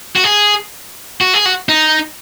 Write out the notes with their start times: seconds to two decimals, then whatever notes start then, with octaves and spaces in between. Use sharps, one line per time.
0.16 F#4
0.25 G#4
1.21 F#4
1.34 G#4
1.45 F#4
1.69 D#4